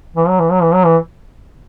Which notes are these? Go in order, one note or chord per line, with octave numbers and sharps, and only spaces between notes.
E3
F#3
E3
F#3
E3
F#3
E3